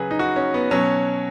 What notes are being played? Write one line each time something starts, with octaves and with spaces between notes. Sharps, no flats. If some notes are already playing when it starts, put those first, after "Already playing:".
Already playing: C#3 F#3 G#4 B4
D#4
F#4
C#4
B3
B2 F#3 C#4